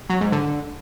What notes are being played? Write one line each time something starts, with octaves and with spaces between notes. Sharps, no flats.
F#3
G#2
D3